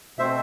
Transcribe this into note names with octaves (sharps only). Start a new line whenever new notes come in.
B2 A3 C4 C5 E5